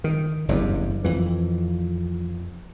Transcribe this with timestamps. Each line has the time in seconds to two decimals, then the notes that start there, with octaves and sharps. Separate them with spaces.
0.04 D#3
0.48 F#1 E2 G2
1.04 F2 E3